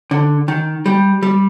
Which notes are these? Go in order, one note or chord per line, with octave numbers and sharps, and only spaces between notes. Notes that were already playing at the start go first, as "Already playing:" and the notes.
D3
D#3
G3
G3